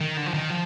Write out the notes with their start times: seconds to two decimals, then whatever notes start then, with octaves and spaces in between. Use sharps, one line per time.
0.01 D#3
0.17 D3
0.26 F3
0.34 D#3
0.50 F3